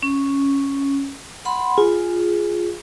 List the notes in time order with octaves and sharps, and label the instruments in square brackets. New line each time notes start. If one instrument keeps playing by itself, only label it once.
[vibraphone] C#4
F#5 B5 C6
[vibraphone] F4 [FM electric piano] G#4